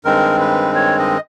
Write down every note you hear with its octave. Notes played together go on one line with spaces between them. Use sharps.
G2 D#3 G#3 C4 A#4
B4
C#5
D#5